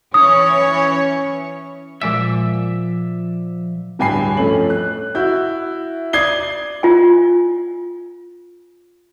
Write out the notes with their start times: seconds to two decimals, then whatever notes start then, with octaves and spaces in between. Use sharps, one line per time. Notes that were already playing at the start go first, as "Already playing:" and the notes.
0.14 E3 C#4 C#5 D#6
2.02 A#2 F3 G#3 D5 E5 E6
3.99 D1 G2 G5 G#5 B5 C7
4.37 F2 A3 C#4 F#7
4.70 F#6
5.15 E4 F#4 G6
6.13 D5 D#6 G#6 C7 G7
6.83 F4 G#5